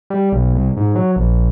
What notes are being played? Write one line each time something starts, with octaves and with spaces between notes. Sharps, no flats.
G3
B1
C2
G#2
F#3
A#1